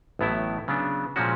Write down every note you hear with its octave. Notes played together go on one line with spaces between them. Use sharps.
A1 A2 F#3 B3 E4
C#3 F#3 B3 D4
A#2 F3 G#3 C#4 F#4